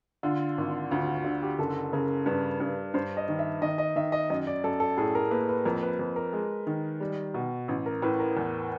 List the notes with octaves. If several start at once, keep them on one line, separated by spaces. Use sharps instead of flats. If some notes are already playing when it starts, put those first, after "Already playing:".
D3 F4
G#1
D2 F4
F#4
D3 F#4
G4
F#1 A4
C#3 A#4
G2 B4
G2
G2 C5
D#5
D#3
E5
D#3 D#5
D#5
D#3 E5
D#5
F#2 D#5
D5
F#2 A4
A4
A2 G#4
A#4
A#3 B4
B4
F2 A#4
B4
F2
A#4
G#3
D#3
G3
B2
A1
A#4
A2 B4
A#4
E2